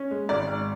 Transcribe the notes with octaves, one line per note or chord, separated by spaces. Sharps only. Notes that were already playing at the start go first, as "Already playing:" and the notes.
Already playing: C#4
G#3
G#1 D5
G#2